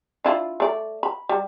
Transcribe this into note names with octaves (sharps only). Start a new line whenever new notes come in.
D4 E4 F4
A3 D5
B5
G3